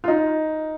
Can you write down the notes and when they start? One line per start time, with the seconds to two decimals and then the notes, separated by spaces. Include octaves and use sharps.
0.04 F4
0.08 D#4